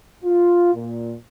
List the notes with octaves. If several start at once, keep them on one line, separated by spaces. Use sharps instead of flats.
F4
A#2